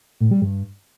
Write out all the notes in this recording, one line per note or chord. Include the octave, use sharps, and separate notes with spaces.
A2
G3
G2